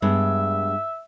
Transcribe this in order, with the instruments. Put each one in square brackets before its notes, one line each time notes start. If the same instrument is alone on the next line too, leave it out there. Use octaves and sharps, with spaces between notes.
[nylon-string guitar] G2 G#3 B3 [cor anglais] E5